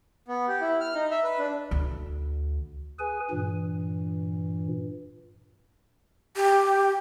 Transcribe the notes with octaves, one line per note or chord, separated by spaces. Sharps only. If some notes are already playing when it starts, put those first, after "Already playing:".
B3
G4
E4
F6
D#4
E5
B4
D4
D2
G#4 B4 G#5
G2 A#2 E3
G4